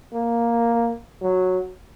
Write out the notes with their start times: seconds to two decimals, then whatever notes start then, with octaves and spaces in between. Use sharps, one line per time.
0.13 A#3
1.22 F#3